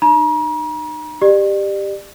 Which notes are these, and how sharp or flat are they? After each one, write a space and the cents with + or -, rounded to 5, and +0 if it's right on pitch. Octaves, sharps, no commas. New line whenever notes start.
D#4 -35 A#5 +40
G4 +10 D5 +35